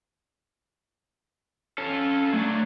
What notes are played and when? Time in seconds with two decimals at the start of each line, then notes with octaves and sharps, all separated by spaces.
1.78 C#4 F4 A4
2.33 F#3 A3 D4